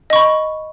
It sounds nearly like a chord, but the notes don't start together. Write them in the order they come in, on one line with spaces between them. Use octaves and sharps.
D#5 C#6 B5